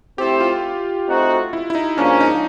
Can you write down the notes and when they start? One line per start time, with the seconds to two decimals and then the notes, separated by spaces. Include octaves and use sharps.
0.18 A3 C4 E4 G4 A4 C5
0.40 F4
1.08 A3 C4 D#4 F#4
1.53 E4
1.70 E4
1.75 D#4
1.98 G#2 F3 A#3 C#4 D4
2.20 D#4